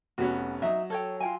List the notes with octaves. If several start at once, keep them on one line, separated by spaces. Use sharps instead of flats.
F1 B3 C#4 F#4
F#3 D#4 E5
A4 C#5 G5
F4 G5 G#5